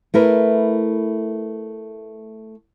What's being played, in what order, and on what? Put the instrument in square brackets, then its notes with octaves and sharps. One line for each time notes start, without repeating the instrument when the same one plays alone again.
[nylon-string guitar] A3 E4 A#4 B4